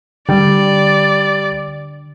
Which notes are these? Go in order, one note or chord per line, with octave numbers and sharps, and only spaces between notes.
D3 G3 D5